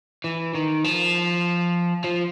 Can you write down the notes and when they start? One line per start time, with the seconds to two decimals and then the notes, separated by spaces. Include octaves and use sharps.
0.24 E3
0.55 D#3
0.84 F3
2.04 F3